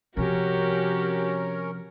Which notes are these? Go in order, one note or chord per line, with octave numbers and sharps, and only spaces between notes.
C3 F3 C#4 F#4 G4 A#4